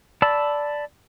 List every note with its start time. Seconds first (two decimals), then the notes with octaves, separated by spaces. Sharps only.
0.22 D5 A5 B5 E6